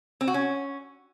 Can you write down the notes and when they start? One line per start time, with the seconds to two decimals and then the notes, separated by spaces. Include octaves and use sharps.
0.21 C4
0.28 F#4
0.34 C#4